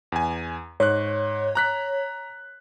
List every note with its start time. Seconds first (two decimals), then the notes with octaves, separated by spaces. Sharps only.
0.12 E2 G#5
0.80 G#2 C#5 F#6
1.55 A#5 F#6 B6